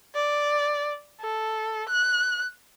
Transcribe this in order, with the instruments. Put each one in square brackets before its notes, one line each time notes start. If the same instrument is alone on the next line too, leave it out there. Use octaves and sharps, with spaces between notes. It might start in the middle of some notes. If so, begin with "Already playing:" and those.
[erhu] D5
A4
F#6